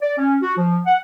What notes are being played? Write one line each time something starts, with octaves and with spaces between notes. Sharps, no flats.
D5
C#4
F#4
F3
F#5